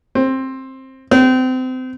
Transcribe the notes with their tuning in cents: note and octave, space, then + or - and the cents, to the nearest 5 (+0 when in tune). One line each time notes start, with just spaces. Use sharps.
C4 +15
C4 -30